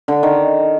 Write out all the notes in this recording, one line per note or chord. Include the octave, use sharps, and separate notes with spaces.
D3
D#3